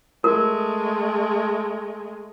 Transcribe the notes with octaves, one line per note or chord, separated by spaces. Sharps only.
G#3 A3 A#4